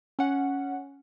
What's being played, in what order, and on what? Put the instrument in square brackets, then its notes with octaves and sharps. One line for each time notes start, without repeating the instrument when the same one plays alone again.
[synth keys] C#4 F#5